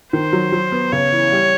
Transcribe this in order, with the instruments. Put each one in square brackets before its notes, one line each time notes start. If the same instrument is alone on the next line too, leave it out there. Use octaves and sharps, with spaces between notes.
[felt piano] D#3 [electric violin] C5
[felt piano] F#3
F#3
B3
[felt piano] C#3 [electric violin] C#5
[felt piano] E3
G3